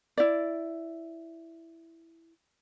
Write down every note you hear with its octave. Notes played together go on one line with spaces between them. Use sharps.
E4 D5